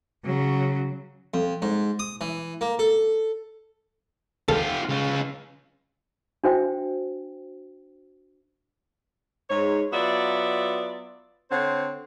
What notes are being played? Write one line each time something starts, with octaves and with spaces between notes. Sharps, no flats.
C#3 F#3
F2
G#2
D#6
E3
A#3
A4
F4 G4 A4
C#3 F4
D4 F#4 C5 E5 G5
G#2 C#5
F#3 B3 F4 D5 E5
D3 C4 C5 C#5 F#5